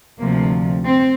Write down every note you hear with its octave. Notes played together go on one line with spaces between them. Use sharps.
D2 C3 F3 A#3
C4